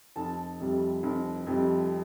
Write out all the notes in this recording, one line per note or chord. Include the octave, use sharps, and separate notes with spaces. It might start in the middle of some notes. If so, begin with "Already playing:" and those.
F1 A5
F2 C3 G3
F1
F2 C3 G3